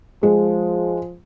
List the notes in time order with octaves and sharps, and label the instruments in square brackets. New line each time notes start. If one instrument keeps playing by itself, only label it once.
[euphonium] F3 [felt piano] G#3